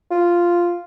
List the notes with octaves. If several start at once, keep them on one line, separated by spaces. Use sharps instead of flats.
F4